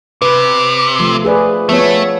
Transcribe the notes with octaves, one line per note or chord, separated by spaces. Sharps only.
C3 B4
F3 A3
G#4 B4 D5
F3 A3 B3 C#5